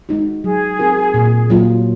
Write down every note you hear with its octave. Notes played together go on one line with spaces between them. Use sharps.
G#3 D#4 F#4
F#3 G#4
C4 F#4 A#4
A#2
F#3 A#3 F4